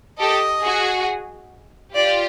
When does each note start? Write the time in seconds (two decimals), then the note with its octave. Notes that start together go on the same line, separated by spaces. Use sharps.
0.19 G4 A4 D#5
0.63 F#4 G#4
1.95 F4 G4 D5